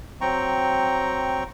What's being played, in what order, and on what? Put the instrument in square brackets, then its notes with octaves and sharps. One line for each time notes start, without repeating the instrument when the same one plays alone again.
[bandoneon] F#3 C4 G5 A#5 C#6